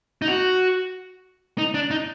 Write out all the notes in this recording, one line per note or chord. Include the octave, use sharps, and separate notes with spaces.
D#4
F#4
D#4
D4
D#4